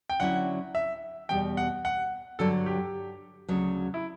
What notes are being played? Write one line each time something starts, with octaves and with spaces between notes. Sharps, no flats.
G5
D3 F#3 C#4 E4 F#5
E5
E2 B2 G3 G5
F#5
F#5
G2 D3 F#3 A4
G4
D2 C#3 F#3
E4